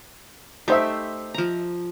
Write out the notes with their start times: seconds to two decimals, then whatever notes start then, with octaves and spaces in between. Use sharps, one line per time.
0.68 A3 D#4 G4 C5 E5
1.34 F3 A#5